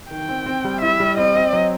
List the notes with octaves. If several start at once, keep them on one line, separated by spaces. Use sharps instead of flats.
D#3 G5
C4
C4
G3
E4 E5
G3
C4 D#5
C4
F#3